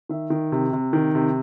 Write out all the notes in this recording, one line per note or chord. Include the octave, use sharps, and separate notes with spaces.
D#3 E5
D#3
C3
C3
D#3
C3